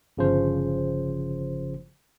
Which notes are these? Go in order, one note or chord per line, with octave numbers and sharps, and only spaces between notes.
G1 C#3 F3 C5